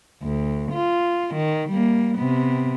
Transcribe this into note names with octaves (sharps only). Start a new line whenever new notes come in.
D2
F4
D#3
G3 A#3
C3 B3